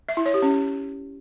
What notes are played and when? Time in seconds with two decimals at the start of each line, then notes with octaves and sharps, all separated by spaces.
0.09 E5
0.17 E4
0.26 C#5
0.34 G4
0.43 C#4